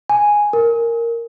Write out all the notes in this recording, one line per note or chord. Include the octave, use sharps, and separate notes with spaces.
G#5
A#4